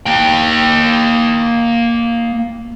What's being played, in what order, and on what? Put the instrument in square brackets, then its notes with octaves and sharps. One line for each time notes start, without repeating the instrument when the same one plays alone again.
[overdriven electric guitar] A#3 G5